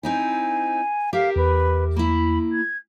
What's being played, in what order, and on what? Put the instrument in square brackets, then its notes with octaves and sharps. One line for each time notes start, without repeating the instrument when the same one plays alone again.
[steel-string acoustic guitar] C4 D#4 E4 [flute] G#5
[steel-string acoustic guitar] G4 A#4 E5 [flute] F5
[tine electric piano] E2 [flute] B4
[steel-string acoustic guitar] A#3 E4 [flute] B5
[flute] G#6